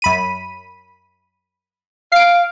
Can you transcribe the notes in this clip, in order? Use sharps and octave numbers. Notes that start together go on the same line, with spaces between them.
F#2 B5 D#7
F5 C7 D7